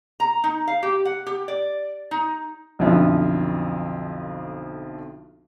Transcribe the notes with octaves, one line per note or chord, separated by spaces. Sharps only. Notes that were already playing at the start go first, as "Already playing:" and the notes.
A#5
D#4
F5
G4
F#5
G4
D5
D#4
B1 F2 D3 F3 E4